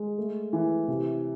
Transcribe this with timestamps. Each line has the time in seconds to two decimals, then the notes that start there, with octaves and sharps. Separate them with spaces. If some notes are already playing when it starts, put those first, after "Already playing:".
Already playing: G#3
0.18 A3
0.53 E3
0.88 C3